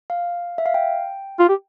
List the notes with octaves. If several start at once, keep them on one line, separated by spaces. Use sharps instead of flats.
F5
E5
F5
G5
F4
G4